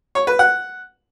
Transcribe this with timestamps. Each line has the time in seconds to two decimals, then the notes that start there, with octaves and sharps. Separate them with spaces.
0.15 C#5
0.27 B4
0.39 F#5